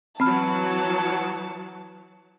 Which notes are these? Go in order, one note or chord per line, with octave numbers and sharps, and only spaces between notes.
E3 F#3 C4 A5 B5 F6